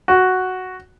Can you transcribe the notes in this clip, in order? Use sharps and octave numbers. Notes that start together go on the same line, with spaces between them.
F#4